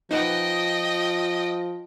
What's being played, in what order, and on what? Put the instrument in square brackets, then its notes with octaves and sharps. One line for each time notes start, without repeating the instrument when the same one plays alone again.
[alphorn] F3 [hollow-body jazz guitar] D#4 B4 F#5 [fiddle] D#5 G5